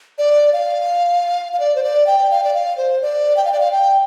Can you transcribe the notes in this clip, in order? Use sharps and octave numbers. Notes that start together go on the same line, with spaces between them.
D5
F5
F5
D5
C5
D5
G5
F5
D5
F5
C5
D5
G5
F5
D5
F5
G5